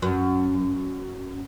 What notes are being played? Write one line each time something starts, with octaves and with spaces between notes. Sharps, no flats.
F#2